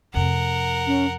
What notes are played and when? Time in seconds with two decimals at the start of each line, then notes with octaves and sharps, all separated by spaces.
0.14 F2 C3 A#4 F#5
0.87 C#4